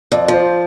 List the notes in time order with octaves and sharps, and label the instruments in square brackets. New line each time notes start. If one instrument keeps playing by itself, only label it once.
[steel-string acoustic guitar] F2 [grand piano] D5
[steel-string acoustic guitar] F3 [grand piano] C5